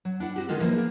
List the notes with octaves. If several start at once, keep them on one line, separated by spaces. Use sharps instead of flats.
F#3
D4 E4 F#5
C4 F#4 G4
D3 D#3 G#3 D#4 F4 A4
E3 F3 A#3 D#4 C5
A#3 B3 G#4